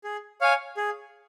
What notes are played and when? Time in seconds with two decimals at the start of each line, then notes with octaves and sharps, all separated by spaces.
0.04 G#4
0.41 C#5 F5 G#5
0.77 G#4